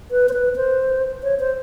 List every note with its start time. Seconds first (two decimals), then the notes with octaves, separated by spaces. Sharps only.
0.11 B4
0.29 C5
0.33 B4
0.56 C5
1.23 C#5
1.40 C5